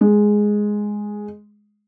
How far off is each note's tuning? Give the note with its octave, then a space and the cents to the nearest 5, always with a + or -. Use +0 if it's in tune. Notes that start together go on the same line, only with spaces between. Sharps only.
G#3 +0